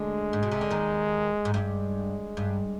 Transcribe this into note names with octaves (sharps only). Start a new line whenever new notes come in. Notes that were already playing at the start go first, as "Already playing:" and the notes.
Already playing: D2 D3 G#3
G#2
B2
C3
D3
D#2 D#3
G#2
G2 G#3
G2